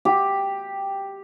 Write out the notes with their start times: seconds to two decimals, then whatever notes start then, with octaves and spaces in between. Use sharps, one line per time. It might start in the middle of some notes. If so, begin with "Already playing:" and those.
0.05 G4